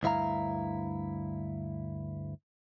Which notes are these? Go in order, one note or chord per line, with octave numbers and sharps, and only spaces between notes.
D2 G2 E4 F5 A#5